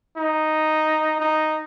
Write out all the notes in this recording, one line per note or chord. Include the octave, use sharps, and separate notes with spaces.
D#4
D#4